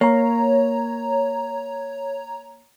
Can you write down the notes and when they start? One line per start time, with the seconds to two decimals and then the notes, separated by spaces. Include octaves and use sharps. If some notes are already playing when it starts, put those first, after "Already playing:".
0.01 A#3 C#5 A#5